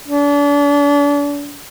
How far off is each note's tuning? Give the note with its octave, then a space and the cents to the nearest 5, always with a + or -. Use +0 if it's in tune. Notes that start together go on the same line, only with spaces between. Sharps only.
D4 -35